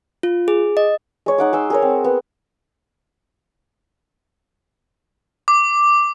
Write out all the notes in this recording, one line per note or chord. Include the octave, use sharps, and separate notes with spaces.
F4
G#4
D#5
G#3 C#5
D#4 F#5 D6
G#4 C6 E6
G#4 A#4 C#5
C4
B3
D6